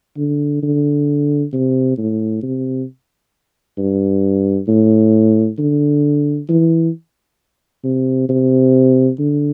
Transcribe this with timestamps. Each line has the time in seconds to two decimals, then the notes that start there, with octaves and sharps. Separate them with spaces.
0.17 D3
0.63 D3
1.53 C3
1.98 A2
2.43 C3
3.78 G2
4.68 A2
5.58 D3
6.49 E3
7.84 C3
8.29 C3
9.19 D3